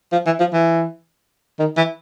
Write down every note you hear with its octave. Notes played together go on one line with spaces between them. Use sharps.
F3
E3
F3
E3
D#3
E3